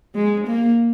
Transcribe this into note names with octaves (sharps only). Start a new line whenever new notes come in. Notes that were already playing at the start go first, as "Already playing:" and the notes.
G#3
A#3